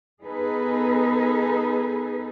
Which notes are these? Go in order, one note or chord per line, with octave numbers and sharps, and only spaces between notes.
B3 D#4 G#4 A4 B4